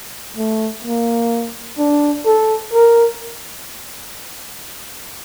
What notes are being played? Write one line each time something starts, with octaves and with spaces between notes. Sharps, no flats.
A3
A#3
D4
A4
A#4